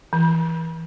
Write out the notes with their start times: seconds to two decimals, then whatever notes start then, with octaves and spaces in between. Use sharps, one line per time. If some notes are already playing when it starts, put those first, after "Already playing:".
0.13 E3